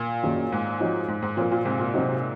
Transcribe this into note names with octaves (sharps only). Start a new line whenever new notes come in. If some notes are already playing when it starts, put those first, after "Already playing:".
Already playing: A#2
F#2 D#3 A#3 D#4 G#4
G#2
F3 C4 D#4 F#4 C#5
G#2
G#2
A#2 F3 C4 F4 A#4
A#2
G#2 C3
A#2
C3 F#3 C4 D#4 F#4